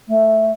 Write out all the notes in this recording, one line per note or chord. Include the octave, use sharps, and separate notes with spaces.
A3